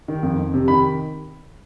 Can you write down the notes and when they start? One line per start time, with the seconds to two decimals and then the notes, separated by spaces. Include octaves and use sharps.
0.08 D#3
0.23 F2
0.39 F2
0.54 C3
0.68 D#3 B5